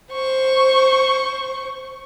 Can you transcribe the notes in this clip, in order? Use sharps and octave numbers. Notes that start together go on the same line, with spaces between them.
C5 C#6